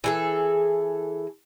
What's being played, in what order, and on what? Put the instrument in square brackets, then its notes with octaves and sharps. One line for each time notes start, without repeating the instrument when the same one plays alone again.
[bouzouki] E3 G#4 A4